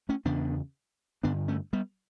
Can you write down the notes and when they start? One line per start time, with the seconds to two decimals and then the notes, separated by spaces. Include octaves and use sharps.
0.09 A3 C#4
0.25 E2 C#3 B3 D4
1.23 G2 D3 B3 D4
1.48 A3 C#4
1.73 G3 B3